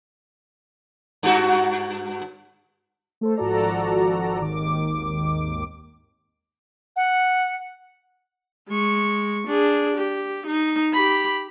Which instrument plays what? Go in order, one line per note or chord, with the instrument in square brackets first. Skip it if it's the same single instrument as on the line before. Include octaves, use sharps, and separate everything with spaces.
[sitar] G2 F#4
[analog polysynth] A3 A4 C5
G#1 F3 F#4 A4 D5 A#5
G#1 D#2 D#3 D6
[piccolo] F#5
[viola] G#3 C#6
D4 G#4
G4
D#4
G4 B5